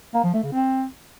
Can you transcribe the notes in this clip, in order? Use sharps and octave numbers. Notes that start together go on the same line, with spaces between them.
A#3
F3
A3
C#3
C4